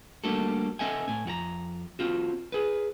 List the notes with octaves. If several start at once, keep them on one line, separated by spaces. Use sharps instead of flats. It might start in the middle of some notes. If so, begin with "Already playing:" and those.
G3 A3 A#3 D4 F#4 A4
C4 A4 D#5 E5 F#5 G#5
A2 G#5
F2 F#4 A#5
C4 F4 F#4
G#4 B4